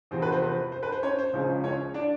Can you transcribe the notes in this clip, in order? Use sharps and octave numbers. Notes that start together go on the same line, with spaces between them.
E2 C3 F3 C5
B4
C5
B4
C5
B4
C5
C#4 C#5
C5
C#2 C#3 F3 G#3 C#4
C#4 C#5
D4 D5